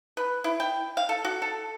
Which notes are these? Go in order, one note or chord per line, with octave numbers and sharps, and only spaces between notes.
B4
E4
G5
F5
A4
F#4
A4